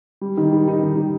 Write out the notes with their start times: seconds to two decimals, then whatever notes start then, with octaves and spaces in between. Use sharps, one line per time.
0.21 G3
0.37 D#3
0.52 G3
0.68 D#4
0.82 D#3
0.96 G3